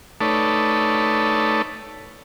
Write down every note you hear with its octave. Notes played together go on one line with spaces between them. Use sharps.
A3 D#4 A4 B4 C#5 D5